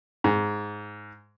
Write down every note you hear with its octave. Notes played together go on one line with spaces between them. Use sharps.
G#2